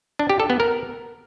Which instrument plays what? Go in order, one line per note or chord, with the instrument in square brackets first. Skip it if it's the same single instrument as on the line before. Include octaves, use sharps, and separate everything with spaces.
[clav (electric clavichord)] D4
G4
A4
B3
A#4